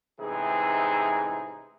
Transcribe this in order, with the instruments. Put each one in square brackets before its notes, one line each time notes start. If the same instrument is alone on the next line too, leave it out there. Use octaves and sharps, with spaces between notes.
[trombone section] A1 C3 E3 G#3 D#4 G#4